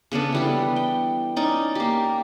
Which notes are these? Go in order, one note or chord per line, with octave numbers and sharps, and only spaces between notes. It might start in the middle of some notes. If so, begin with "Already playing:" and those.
C#3 B3 D4 A4
E3 G3 B3
G5
C#4 D#4 D5
A#3 G4